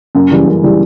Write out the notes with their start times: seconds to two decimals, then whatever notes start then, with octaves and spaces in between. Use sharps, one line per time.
0.15 F#2
0.31 C#3 E3 G3
0.46 F#2
0.63 C#3 E3 G3